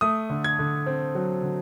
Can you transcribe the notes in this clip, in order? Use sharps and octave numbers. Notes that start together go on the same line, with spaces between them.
A3 D#6
D3
G#6
D3
C4
F#3
D3